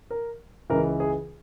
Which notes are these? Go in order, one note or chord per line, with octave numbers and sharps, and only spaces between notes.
A#4
C#2 C#3 E3 A#4
G#4